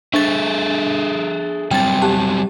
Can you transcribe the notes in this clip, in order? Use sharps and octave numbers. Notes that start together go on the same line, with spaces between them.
D4 G#4 A4 E5 A6
F#3 G3 C4 G5 A6
G4 A5